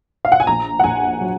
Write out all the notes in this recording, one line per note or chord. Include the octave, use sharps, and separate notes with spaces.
F5
F#5
G#5
A#1 A#5
F#5
A#1 G#5
F#3